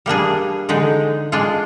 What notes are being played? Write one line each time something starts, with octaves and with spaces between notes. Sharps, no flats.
G3 A#3 D4 G#4
D3 G#3 D#4
G#3 D4 F4 G#4